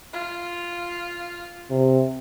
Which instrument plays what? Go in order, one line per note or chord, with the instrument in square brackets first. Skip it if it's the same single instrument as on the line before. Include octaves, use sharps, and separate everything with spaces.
[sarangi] F4
[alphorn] C3